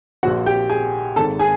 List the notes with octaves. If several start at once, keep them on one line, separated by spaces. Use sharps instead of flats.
A#1 A#2 F3 F#4 F#5
G4 G5
G#4 G#5
G#1 G#2 D#3 A4 A5
G#4 G#5